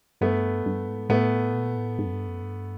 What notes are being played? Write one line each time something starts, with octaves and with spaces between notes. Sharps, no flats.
G2 A3 B3
G2
G#2
A2 A3 B3
A#2
A2
G#2
F#2
G2
F#2
G2